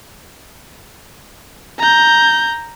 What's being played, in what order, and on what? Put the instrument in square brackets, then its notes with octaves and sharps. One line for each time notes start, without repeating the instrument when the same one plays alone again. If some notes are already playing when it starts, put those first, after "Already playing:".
[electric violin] A#5 G6